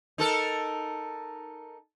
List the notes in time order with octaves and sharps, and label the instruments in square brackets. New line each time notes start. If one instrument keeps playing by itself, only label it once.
[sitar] D#4 A4 A#4